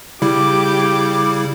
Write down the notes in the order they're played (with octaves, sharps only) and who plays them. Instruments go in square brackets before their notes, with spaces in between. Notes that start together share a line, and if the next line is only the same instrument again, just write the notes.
[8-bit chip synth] C#3 G3 E4 [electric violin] G4 D6